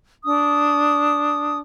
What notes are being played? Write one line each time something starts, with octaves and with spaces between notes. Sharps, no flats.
D4 D#6